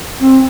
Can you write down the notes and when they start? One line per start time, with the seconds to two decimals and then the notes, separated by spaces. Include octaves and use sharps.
0.20 C4